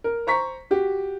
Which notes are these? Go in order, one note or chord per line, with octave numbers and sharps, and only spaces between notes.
A#4
C5 A#5 C#6 B6
F#4 G4